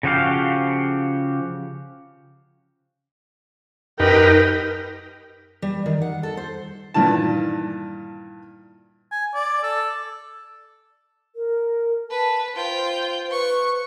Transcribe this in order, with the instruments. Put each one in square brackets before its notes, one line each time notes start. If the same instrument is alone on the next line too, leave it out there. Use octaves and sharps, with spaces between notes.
[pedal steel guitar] C#3 F3 F#4 G4 F5
[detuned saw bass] F#2 [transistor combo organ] D#4 G4 B4 [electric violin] A#4 G5
[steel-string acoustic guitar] G3
D#3
F#5
A4
C5
[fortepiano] G2 A#2 D#3 E3 A5
[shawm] G#5
D5
A4
[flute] A#4
[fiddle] B4 [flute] A5
[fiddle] F4 G5 [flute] C5
[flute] B4 [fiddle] C#6